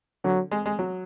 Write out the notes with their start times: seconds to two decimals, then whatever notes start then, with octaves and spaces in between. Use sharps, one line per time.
0.24 D3 F#3
0.51 G#3
0.66 G#3
0.79 F#3